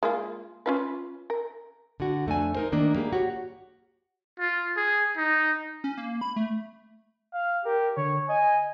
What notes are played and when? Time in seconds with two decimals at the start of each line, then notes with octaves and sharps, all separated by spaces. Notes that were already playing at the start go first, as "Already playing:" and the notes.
0.03 G#3 A#3 F4
0.66 C#4 F4 B4
1.30 A#4
2.00 D3 F#4
2.26 F2 A3 D4 G#5
2.55 D#4 A#4 C5
2.72 D#3 A3 A#3 D4
2.95 G3 A#3 G4 G#4
3.13 F#4 G4 C#5
4.40 F4
4.77 G#4
5.17 D#4
5.84 C#4
5.97 A#3
6.21 B5
6.36 A3
7.33 F5
7.65 G4 A#4
7.97 D3 C#5
8.29 D#5 G#5